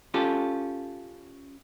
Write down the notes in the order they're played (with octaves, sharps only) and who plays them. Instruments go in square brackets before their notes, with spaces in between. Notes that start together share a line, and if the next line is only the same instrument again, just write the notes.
[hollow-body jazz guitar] C#4 F4 G4 A4